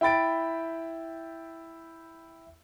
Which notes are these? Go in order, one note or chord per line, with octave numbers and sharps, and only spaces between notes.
E4 G5 B5 A6 D7